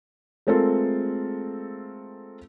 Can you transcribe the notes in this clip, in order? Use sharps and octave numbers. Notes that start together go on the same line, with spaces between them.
G#3 A3 C4 F4 A4 A#4